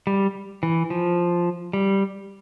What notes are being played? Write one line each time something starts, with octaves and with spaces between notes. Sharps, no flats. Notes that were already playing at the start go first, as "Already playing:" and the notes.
G3
E3
F3
G3